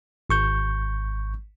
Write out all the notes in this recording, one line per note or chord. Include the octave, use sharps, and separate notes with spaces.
G#1 C#6 G6